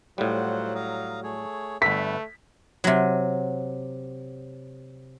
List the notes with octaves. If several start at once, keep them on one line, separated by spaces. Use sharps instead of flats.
A2 F#3 G3 F4 C5 F#5
F5 A#5 D#6
A3 G#4 C#5
G1 A3 B4 E5 B6
C3 F#3